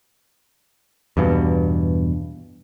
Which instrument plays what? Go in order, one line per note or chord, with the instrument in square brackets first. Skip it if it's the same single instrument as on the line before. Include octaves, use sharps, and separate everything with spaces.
[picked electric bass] E2 G2 B2